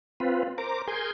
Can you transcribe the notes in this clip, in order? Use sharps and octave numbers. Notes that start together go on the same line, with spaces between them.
C4 F4 B4
A#4 C5 A#5 D6
G#4 A#4 G#5 C6 G6